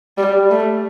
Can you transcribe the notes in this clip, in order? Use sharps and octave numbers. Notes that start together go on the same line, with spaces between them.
G3
A3